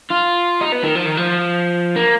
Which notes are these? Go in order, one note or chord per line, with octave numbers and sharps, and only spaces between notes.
F4
D#4
B3
D#3
F3
D#3
F3
A#3